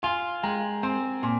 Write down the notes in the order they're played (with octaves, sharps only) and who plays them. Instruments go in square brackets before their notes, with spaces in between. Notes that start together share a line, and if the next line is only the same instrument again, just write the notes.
[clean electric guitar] F4 [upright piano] G#5 C6
[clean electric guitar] G#3 [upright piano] G5 A#5
[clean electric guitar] C4 [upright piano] G#5 C6
[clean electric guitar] A#2 [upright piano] G#5 C6